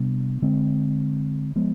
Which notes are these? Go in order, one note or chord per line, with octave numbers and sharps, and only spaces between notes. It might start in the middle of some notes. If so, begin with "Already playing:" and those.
Already playing: C3 G3 B3 D4
D3 G#3 C4
F3 G#3 B3